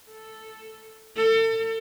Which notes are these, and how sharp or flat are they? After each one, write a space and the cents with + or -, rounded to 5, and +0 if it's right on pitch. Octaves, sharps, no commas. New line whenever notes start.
A4 +0
A4 +35